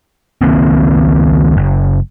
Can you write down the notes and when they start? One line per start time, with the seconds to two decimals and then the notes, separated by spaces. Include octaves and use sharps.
0.41 C#2 D#3 A#3 C4
1.57 F#1